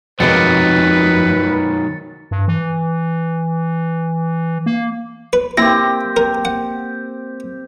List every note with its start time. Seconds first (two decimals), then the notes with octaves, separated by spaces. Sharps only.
0.20 F2 C3 D#3 F#3 G#3 B4 A6 C#7
2.31 G2
2.48 E3
4.66 A#3
5.33 B4
5.58 A#3 C4 E4 G4 A#6
6.17 A#4
6.45 F#5